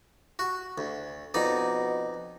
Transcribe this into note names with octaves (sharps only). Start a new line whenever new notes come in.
F#4
D2
F2 B2 D#4 D5